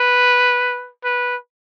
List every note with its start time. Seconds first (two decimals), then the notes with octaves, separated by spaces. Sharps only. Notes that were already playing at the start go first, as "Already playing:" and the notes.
Already playing: B4
1.04 B4